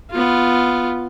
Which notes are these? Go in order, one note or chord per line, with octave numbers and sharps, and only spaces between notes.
B3 F4